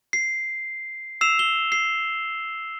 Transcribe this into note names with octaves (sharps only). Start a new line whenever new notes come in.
C7
E6 C7 E7 F7
G7
C7